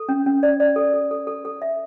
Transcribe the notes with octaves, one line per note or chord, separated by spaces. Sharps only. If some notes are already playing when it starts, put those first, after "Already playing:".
Already playing: A4
C#4
C#4
D5
D5
A4
A4
A4
A4
A4
E5